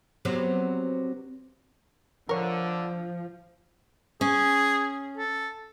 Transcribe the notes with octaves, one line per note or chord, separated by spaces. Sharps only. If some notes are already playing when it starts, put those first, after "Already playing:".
C3 F#3 B3
D3 F3 A#4 C#5
C#4 G#4
A4